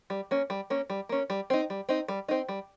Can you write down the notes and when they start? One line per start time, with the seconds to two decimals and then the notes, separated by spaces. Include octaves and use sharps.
0.10 G3
0.31 A#3 C#4
0.50 G3
0.70 A#3 C#4
0.90 G3
1.09 A#3 C#4
1.30 G3
1.50 C4 D#4
1.70 G3
1.89 C4 D#4
2.08 G3
2.28 C4 D#4
2.48 G3